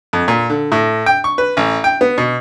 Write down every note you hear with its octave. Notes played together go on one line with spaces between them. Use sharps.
F2
A#2
D3
A2
G5
C#6
B4
A1
G5
B3
B2